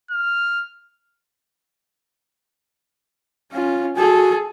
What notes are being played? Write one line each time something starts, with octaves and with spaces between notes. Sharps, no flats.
F6
C#4 F4
F#4 G#4 A4